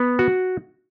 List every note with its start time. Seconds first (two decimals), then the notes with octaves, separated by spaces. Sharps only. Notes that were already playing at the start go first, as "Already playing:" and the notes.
Already playing: B3
0.19 F#4